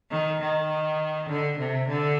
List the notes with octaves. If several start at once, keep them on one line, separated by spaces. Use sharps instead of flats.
D#3
D#3
D3
C3
D3